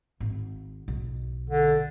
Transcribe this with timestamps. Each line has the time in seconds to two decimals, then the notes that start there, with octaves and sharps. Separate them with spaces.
0.20 G#1
0.88 B1
1.50 D3